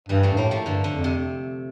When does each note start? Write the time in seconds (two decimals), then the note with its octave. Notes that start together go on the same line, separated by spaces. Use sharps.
0.09 G2 E3 G3
0.23 F3 A3
0.33 G2
0.37 A2 G3 A#3
0.51 F3 A3
0.65 G2 D3 F3
0.84 D3
0.94 F2
1.04 C3